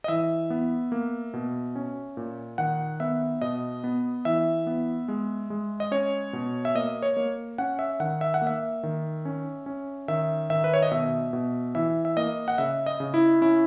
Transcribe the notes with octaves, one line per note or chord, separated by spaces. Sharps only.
D#5
E3 E5
B3
A#3
B2
C#4
A#2
D#3 F#5
B3 E5
B2 D#5
B3
E3 E5
B3
G#3
G#3
D#5
C#4 C#5
B2
E5
A#3 D#5
C#5
A#3
C#4 F#5
E5
D#3 F#5
E5
F#5
A#3
E5
D#3
C#4
C#4
D#3 E5
D#3 E5
B4
C#5
D#5
B2 E5
B2
E3 E5
E5
A#3 D#5
F#5
C#3 E5
D#5
C#3
E4
C#4 E4